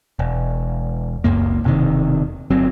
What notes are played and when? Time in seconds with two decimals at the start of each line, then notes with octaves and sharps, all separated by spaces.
0.19 E1
1.24 F#1 C#2 F#2 A#3
1.64 E1 C3 D#3
2.51 G1 F#3 C4